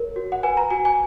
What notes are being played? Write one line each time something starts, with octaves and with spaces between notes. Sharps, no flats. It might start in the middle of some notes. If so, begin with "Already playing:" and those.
Already playing: A#4 C#5
F#4
F#5
B4 G#5
A#5
F#4 G#5
G#5